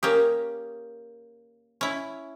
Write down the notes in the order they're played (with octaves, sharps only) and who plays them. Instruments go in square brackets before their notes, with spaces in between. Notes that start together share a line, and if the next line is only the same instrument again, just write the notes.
[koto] A#3 C#4 G4 [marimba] A#4 D#6
[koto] C#4 E4